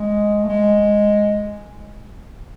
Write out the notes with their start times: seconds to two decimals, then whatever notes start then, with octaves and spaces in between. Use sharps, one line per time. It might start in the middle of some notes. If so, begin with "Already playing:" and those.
Already playing: G#3
0.43 A3
0.49 G#3